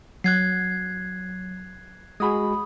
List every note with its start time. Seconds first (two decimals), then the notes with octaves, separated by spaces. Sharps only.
0.24 F#3 F#6 G#6 C7
2.20 G#3 F#4 G#4 B5 D#6